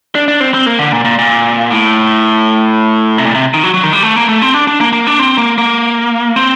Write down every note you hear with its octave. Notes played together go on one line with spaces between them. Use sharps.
D4
D4
C4
C4
A#3
D3
A#2
A#2
A#2
A2
C3
A#2
C3
D#3
F#3
F#3
D#3
G3
A3
A#3
A3
C4
D4
D4
A#3
A#3
D4
C4
A#3
A#3
C4